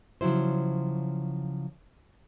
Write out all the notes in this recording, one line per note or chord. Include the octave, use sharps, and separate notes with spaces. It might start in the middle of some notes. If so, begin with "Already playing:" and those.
C#3 F3 F#3 E4 C5